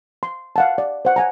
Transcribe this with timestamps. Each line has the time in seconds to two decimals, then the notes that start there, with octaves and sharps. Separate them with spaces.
0.23 C6
0.56 F5 F#5 A5
0.78 D5
1.05 C5 F#5
1.16 F#5 G#5 A#5